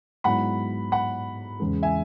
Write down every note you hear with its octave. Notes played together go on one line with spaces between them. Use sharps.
G#2 F#3 B3 E4 F#5 B5
F#5 B5
E2 C#3 G#3
E5 G#5